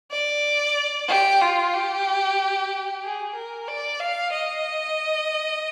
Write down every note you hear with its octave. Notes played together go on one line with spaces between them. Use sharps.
D5
G4
F4
G4
G#4
A#4
D5
F5
D#5